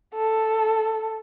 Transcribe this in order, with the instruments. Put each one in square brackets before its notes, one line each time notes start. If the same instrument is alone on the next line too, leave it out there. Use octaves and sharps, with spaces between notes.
[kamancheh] A4